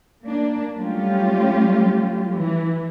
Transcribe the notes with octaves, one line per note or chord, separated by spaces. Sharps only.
A#3 D4
F#3 G3 A3 C#4 F4 G4
E3